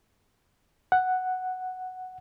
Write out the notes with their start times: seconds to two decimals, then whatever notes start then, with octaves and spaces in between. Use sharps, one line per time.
0.92 F#5